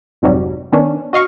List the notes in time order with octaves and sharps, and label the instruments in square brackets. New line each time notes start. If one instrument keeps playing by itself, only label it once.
[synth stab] G1 F2 G#2 C3 F#3 G3
D#3 B3 C#4 D4
F#4 D#5 F5 C#6